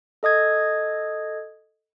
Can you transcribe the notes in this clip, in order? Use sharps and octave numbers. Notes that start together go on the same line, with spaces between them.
A4 D#5 D#6 G#6